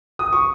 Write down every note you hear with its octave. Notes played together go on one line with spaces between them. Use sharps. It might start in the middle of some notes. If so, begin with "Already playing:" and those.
D#6
C#6